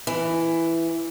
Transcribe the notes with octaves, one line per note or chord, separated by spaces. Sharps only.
E3